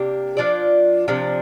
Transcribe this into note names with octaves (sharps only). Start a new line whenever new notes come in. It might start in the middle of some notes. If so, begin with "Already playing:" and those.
Already playing: C3 A#3 D4 G4
F3 D4 F4 D5
C3 F3 D4